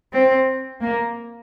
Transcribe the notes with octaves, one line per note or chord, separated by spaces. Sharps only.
C4
A#3